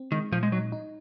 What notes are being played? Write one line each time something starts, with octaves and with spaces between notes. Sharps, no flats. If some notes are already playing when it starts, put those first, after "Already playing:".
Already playing: C4
D#3 G#3
A#2 F3
G#3
F#3 D#4
D#4